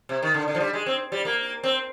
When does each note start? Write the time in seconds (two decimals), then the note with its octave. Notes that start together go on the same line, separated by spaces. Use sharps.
0.09 C3
0.23 D#3
0.34 D3
0.48 D3
0.55 F3
0.60 G3
0.73 G#3
0.86 C4
1.12 G3
1.25 A#3
1.64 C4